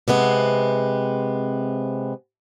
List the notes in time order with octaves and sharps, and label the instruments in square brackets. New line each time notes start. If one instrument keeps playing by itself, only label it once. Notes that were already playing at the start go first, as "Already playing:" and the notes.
[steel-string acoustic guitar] C3 G#3 B3 C4